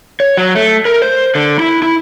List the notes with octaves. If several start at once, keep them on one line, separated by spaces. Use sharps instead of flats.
C#5
F#3
A3
A#4
C5
D3
E4
E4